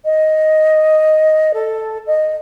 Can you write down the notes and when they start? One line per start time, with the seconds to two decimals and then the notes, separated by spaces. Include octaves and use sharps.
0.05 D#5
1.54 A4
2.07 D#5